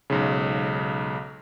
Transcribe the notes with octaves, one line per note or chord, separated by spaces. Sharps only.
B1 G#2 C#3